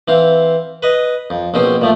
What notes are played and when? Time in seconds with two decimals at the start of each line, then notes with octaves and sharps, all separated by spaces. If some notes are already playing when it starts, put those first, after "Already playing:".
0.08 E3 C4 F5
0.83 B4 D#5
1.30 F2
1.54 A#1 B2 C4 C#4 G5 C6
1.81 A#2 F3 A3